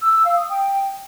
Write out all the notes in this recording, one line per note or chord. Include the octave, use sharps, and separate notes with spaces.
E6
E6
F5
D#6
G5